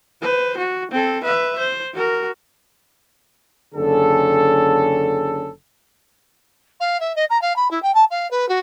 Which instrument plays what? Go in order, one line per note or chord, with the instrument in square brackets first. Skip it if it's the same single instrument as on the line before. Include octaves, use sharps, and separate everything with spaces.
[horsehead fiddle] B4 C5
F#4
C4 A4
B4 E5
C5
F#4 A#4
[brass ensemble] F#1 D3 C#4 G#4 A4
[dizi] F5
E5
D#5
A#5
F5
B5
E4
G5
A5
F5
B4
F#4